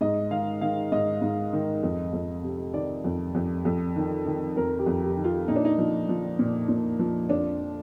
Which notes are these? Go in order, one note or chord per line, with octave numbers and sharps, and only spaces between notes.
G#2 D#5
D#3 F5
D#3 F5
G#2 D#5
G#2
D#3
F2
F2
C3
D#3 D5
F2
F2
F2
D#3
D#3
F2 A#4
G4
F2
G4
D#3
F4
A#2 D#4
D4
D#4
F3
F3
A#2
A#2
F3
F2 D4